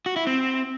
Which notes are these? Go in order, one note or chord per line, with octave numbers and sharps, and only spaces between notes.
F#4
E4
C4